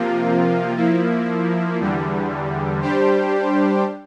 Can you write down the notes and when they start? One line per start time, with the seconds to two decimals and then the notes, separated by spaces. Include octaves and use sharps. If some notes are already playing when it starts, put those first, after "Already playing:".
Already playing: C3 F3 A#3 F4
0.77 F3 A#3 E4
1.80 E2 D3 G3
2.81 G3 D4 G4 C5